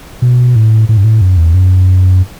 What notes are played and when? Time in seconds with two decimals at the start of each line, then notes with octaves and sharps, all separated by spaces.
0.22 B2
0.56 A2
0.89 A2
0.97 G2
1.04 A2
1.21 F#2
1.37 E2
1.54 F#2